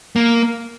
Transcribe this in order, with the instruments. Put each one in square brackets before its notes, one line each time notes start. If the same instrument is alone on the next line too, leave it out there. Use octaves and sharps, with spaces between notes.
[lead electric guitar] A#3